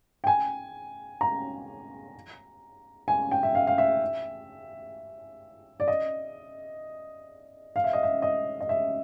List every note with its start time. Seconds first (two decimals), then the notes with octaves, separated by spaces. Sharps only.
0.24 G5
0.27 G#5
1.21 A#5
3.08 G#5
3.31 G5
3.43 E5
3.55 F5
3.67 F5
3.78 E5
5.80 D5
5.88 D#5
7.76 F5
7.84 E5
7.93 D#5
8.03 E5
8.22 D#5
8.61 D#5
8.69 E5